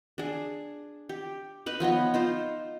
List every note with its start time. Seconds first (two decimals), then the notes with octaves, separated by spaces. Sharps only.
0.18 D4 G#4
1.09 G4
1.66 D#4 B4
1.80 F3 B3 C#5 D#5
2.14 D#4 F4 C5